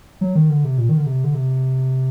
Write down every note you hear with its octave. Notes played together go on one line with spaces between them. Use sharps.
F#3
D#3
D3
C3
A#2
D#3
D3
C3
D3
C3